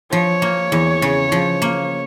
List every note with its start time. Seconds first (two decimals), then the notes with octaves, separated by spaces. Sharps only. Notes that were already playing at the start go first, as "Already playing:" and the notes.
0.12 F3 C#5
0.42 A#3
0.72 E2
1.02 C#3
1.32 F3
1.62 A#3